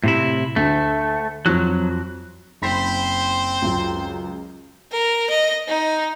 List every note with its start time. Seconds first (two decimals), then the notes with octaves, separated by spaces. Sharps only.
0.04 A2 C3 E4
0.56 D2 A3
1.46 F2 F3 F#3 F#6
2.62 F#1 C4 C5 B5 B6
3.62 C#2 F#2
4.92 A#4
5.30 D#5
5.68 D#4